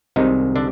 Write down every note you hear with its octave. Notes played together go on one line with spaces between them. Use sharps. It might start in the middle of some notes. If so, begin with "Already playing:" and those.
C2 C3 D#3 G#3 D#4
D3 D4